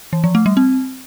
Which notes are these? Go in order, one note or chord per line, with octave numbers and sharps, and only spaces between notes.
E3
F3
A3
G3
C4